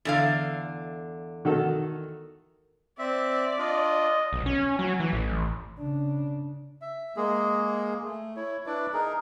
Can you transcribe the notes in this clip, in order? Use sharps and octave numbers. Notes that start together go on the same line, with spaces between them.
E2 D3 F5
D#3 F#4 A4
C4 D5 E5
D4 F4 D#5
B1
C#4
F#3
E3
A1
C#3 D4
E5
G#3 A#3 G#4
A3
E4 C#5
D4 E4 B4 D5
D#4 G#4 A#4